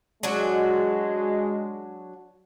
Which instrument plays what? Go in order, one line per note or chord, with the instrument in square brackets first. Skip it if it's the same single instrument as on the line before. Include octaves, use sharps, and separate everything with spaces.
[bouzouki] F#3 D4 F#4 [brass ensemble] G#3